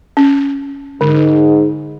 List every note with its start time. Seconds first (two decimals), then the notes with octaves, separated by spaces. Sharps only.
0.17 C#4
1.01 G#2 D3